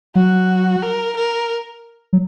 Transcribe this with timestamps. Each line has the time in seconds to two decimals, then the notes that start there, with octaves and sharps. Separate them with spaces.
0.15 F#3 F#4
0.82 A#4
1.16 A#4
2.13 F#3